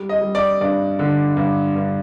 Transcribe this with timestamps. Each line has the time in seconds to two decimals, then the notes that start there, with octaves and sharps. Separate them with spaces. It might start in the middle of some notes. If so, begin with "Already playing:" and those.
Already playing: G3
0.09 D#5
0.21 G3
0.35 D5
0.61 G2 D5
0.99 D3
1.37 G2
1.76 G2